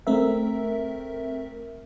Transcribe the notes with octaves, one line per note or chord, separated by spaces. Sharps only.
A3 C4 A#4 E5